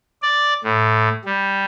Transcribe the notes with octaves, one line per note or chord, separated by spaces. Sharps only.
D5
A2
G3